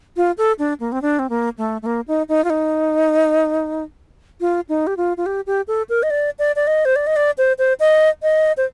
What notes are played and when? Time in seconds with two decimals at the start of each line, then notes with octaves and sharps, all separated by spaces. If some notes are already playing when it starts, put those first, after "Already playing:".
0.17 F4
0.38 A4
0.59 D4
0.80 A#3
0.92 C4
1.02 D4
1.19 C4
1.30 A#3
1.58 A3
1.82 A3
1.86 A#3
2.08 D#4
2.29 D#4
2.44 F4
2.50 D#4
4.41 F4
4.69 D#4
4.87 G4
4.97 F4
5.17 F4
5.26 G4
5.47 G4
5.68 A4
5.89 A#4
6.03 D#5
6.10 D5
6.39 D5
6.56 D5
6.67 D#5
6.85 C5
6.96 D5
7.07 D#5
7.16 D5
7.38 C5
7.59 C5
7.80 D#5
8.23 D#5
8.57 C5